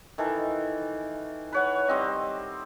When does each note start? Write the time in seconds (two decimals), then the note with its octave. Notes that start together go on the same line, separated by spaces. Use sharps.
0.18 D#3 E3 A4
1.53 B4 C#5 F#5
1.88 G3 C4 D#5